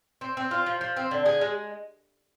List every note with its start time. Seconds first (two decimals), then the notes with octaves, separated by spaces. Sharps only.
0.21 C4
0.37 C4
0.51 F4
0.66 F3
0.81 F3
0.97 C4
1.11 D3
1.26 G#4
1.41 G#3